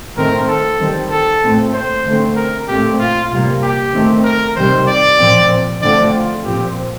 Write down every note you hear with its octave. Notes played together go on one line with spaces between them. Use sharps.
D#3 A3 C4 A#4
A4
D#3 G3 C4
A4
A#2 A3 C4
C5
D3 A3 C4
A#4
A#2 A3 C4 G4
F4
C3 G3 A#3 F4
G4
D#3 A3 C4
A#4
C3 D#3 G3 C4 C5
D5
A#2 F3 C4
D3 F3 A3 C4 D5
F4
A#2 F3 C4 G4